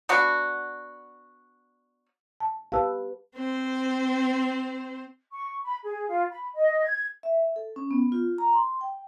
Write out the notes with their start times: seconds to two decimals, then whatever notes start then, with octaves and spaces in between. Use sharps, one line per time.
0.09 B3 D4 F#4
2.40 A5
2.72 G4 B4 F5 A5 E6
3.35 C4 C5
5.32 C#6
5.64 B5
5.84 G#4
6.09 F4
6.31 B5
6.55 D#5
6.84 G#6
7.23 E5
7.56 A4
7.76 C#4
7.91 B3
8.12 F4
8.38 A#5
8.53 C6
8.81 G5